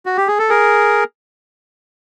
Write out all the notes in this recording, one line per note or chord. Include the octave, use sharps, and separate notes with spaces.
F#4
G4
G#4
A4
G#4 A#4